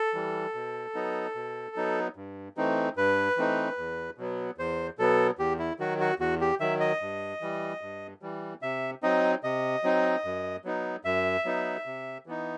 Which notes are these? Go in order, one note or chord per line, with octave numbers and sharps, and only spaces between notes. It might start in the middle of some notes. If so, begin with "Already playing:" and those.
Already playing: A4
E3 G3
B2
F#3 B3 D#4
B2
F#3 B3 D#4
G2
E3 A3 C4 D#4
G2 B4
E3 A3 C4 D#4
E2
B2 F#3 B3
E2 C5
B2 F#3 B3 A4
E2 G4
E4
D#3 F#3 F#4
F#4
E2 F#4
G4
D#3 F#3 E5
D#5
G2
E3 G3
G2
E3 G3
C3 E5
F#3 C4 D#4 D#5
C3 D#5
F#3 C4 D#4
F#2
F#3 B3 D#4
F#2 E5
F#3 B3 D#4
C3
E3 B3 D#4